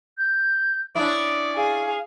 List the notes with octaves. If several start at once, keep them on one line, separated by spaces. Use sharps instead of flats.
G6
C#4 D4 E4 D5 D#6
G#4 F5